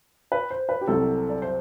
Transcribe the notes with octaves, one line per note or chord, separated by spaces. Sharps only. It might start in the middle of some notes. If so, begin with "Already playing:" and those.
B4
C5
B4
G4
C2 C3 F#3 C4 A4
D5
C5